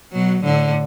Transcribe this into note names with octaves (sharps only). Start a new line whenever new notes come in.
B2 F#3
A2 D3